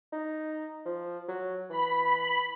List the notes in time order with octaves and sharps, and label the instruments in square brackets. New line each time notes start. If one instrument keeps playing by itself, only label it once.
[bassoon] D#4
F3
F#3
[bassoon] E3 [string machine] B5